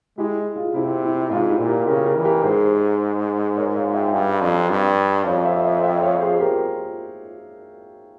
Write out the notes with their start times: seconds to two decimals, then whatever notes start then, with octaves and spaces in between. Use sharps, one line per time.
0.18 G#3 E4 G4
0.56 F4 G#4
0.74 C3 E4
1.03 E4
1.31 G#2 F4
1.49 E4 G4
1.59 A#2
1.68 G4 A#4
1.87 C#3 G4 A#4
2.06 G4 A#4
2.16 E3
2.25 G4 A#4
2.44 G#2 G#4 C5
3.57 A#4 C#5
3.76 C#5 F5
3.94 E5 G5
4.13 G2 F5 G#5
4.41 F2
4.70 G2
5.26 F2 C#5 F5
5.45 C5 E5
5.64 C5 E5
5.83 E5 G5
6.02 C#5 F5
6.21 G#4 C5
6.40 G4 A#4